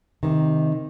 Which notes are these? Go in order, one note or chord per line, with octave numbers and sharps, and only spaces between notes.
C3 D#3